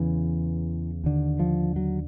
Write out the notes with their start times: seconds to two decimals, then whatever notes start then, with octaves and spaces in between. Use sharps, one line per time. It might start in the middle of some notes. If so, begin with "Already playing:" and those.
Already playing: E2 C#3 E3
1.04 D#2 D3
1.39 F3
1.76 F#3